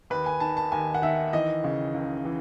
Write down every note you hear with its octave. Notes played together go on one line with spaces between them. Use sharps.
D#2 B4
G#5
D#3 A5
A5
D#2 G#5
F#5
D#3 E5
E3 D#5
C#3
C#2
E3